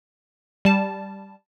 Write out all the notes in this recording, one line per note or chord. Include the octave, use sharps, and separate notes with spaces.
G3 A5